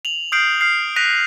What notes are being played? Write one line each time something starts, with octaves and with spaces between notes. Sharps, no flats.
F7 F#7
D#6 F6 G6 C7 D7 F#7
F6 C7
F#6 A#6 B6 D#7 F7